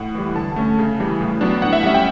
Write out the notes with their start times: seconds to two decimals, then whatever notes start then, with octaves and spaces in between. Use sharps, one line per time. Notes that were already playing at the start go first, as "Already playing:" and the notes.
Already playing: A2 F#5
0.15 E3 G3
0.35 D3 A5
0.56 A3 C#4
0.79 C#3
0.99 E3 G3
1.21 A2
1.41 F#3 B3 D4
1.62 A2 F#5
1.73 E5
1.83 G3 C#4 F#5
1.94 G5